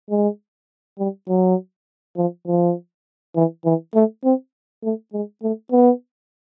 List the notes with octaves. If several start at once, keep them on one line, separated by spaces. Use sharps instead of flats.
G#3
G3
F#3
F3
F3
E3
E3
A3
C4
A3
G#3
A3
B3